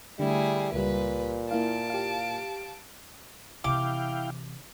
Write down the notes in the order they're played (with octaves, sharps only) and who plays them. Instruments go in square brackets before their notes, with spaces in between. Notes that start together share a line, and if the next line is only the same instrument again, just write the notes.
[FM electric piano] D3 A3 [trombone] G3 [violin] E4 G#4
[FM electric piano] C#2 G3 [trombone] A#2 [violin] B4
[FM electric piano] A#3 E4 F5 [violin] A5 D7
[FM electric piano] G4 F5
[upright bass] C3 E3 [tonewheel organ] E4 F5 G5 [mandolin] D6